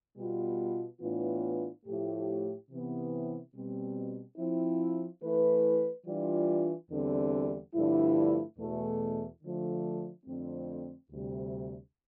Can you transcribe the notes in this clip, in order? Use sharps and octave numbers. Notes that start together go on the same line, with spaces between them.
B2 G3 B3 F4
A2 E3 B3 D4 F4
A2 F3 A3 E4 G4
C3 E3 B3
B2 G3 C4
F3 C4 E4
E3 A3 E4 B4
E3 G3 D4 F4
E2 D3 G3 C4
G2 D3 F3 A3 E4
E2 B2 A3
D3 F3 A3
F2 D3 A3 C4
D2 C3 G3